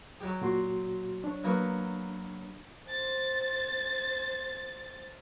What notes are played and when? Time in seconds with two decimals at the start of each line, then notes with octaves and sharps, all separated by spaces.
0.21 F#3 G4
0.42 A#2 F#4 C6
1.24 D4 C#5
1.44 F#3 A#3 B3
2.89 C5 A6